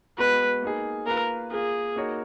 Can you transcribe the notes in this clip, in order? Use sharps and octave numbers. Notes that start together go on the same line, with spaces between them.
G#3 B3 F#4 B4
A#3 D#4 G#4
A#3 F4 A#4 B4
A#3 F4 G#4 A#4
A#3 D#4 F#4 A#4 C#5